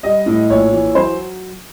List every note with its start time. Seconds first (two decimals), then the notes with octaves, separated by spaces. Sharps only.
0.03 G3 D#5
0.26 A2
0.50 A#1 C#5
0.72 E3
0.95 F#3 C5